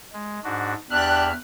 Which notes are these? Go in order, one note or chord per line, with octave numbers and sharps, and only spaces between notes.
G#3
G#2 D4 F#4
E2 D4 G4 E5 F6 F#6